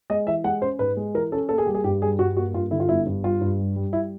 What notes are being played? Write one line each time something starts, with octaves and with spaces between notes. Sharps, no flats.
G#3 D#5
E3 E5
G#3 F#5
C#4 C5
G#2 B4
G#3
E3 A#4
C#4 A4
A#3 A4
G#4
G3 G4
G#4
G2 G4
G3 G#4
G2 F#4
A#3 F#4
G2 F4
D3 E4
F4
G1 E4
G2
G3 F4
G2
G3
G3
E4